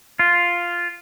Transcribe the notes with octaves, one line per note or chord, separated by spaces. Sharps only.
F4